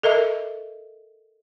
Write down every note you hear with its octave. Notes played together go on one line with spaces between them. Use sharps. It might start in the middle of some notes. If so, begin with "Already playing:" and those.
A4 A#4 D#5 E5